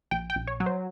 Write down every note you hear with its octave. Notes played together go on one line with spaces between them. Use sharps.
A#1 G5
G5
A#1
C#5
F#3
C5